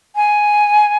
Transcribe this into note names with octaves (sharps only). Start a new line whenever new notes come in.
G#5